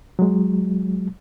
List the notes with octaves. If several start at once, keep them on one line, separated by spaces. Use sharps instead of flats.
F#3 G#3